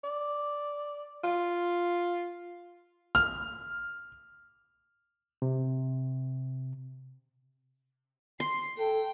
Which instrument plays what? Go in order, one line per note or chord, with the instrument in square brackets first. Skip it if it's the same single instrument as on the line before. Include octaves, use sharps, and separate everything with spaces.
[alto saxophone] D5
F4
[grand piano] F6
[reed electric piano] C3
[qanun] C6 [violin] C7
[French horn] A4 [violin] G5